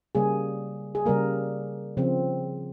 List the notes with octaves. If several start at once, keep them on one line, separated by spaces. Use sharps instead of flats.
C#3 G3 A#3 G#4
G#4
C#3 G3 A#3 A#4
C#3 F3 C4